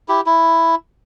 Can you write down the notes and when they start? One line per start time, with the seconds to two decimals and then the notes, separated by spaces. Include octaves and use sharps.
0.08 E4 G4
0.26 E4